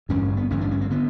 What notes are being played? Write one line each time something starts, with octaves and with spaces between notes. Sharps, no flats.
A1 G2 D3 C#4
B3
A1 G2 D3 C#4
D4
C#4
C4
D3 B3